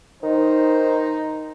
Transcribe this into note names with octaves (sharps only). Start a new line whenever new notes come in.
D#3 D#4 C5